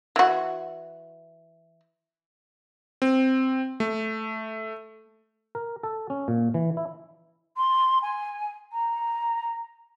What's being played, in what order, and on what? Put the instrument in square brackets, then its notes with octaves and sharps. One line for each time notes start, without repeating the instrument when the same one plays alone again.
[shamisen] E3 F#4
[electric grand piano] C4
A3
[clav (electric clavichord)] A#4
A4
C#4
A#2
E3
E4
[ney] C6
G#5
A#5